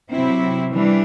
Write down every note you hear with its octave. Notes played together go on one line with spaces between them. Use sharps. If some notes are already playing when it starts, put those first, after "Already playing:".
C3 F#3 C4 E4
E3 G3 D4